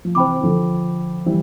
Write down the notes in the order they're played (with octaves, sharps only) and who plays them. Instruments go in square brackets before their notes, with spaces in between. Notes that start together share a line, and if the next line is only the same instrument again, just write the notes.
[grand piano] F3
[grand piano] C3 E3 [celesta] C5 G5 B5 D6
[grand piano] E3
D3 F3
[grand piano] E3 G3 [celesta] C5